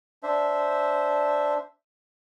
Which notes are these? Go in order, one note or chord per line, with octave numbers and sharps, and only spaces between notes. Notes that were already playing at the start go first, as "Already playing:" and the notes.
D4 C5 E5